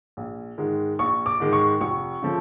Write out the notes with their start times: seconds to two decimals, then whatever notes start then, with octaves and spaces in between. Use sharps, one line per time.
0.17 A#1
0.58 G#2 D#3 G#3
0.99 A#1 C#6
1.26 D6
1.40 G#2 D#3 G#3
1.53 C#6
1.81 F1 C#6
2.22 C#3 F3 A3